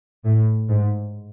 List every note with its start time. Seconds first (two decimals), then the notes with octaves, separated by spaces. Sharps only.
0.24 A2
0.69 G#2